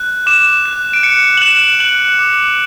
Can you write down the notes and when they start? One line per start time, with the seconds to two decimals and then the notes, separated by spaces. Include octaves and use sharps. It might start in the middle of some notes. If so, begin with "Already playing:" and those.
Already playing: F#6
0.26 D6 E7
0.66 F#6
0.93 D7
1.03 F#6 C#7
1.37 F#7
1.42 F#6 E7
1.80 F#6 F#7
2.19 D6